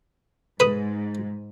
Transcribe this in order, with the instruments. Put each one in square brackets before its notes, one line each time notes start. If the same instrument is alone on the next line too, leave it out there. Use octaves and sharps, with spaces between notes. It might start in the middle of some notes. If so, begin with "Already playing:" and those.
[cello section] G#2 [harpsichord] B4 D#6